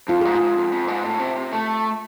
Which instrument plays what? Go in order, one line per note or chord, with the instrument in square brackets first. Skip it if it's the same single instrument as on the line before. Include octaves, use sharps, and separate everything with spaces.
[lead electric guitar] F2 [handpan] F4
[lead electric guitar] G#2 [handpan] G#4
[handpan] F4
[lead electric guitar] G#2
F2
F2
G#2
A2
C3
C3
A3